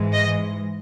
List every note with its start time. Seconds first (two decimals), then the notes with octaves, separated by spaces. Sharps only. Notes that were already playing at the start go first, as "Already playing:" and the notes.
Already playing: G#2 E3 G#3
0.13 D#5